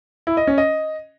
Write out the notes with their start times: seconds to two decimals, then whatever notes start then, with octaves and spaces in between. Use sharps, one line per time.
0.27 E4
0.37 D#5
0.47 C#4
0.58 D#5